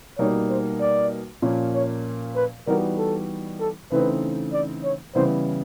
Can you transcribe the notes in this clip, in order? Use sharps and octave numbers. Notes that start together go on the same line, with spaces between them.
B2 G3 A#3 D#4 C#5
C5
D5
A#2 F3 A#3 C#4
C#5
B4
E3 G3 B3 D#4 F#4 A#4
A4
A4
C#3 E3 A3 C4 D#4 B4
D5
C#5
C#3 E3 G3 B3 E4 C5